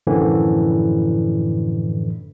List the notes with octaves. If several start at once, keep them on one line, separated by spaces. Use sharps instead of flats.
F#2 A2 D3 E3 F3